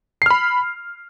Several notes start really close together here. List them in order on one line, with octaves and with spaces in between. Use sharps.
C7 F6 B5